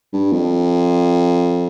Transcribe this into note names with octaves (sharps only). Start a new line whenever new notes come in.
G2
F2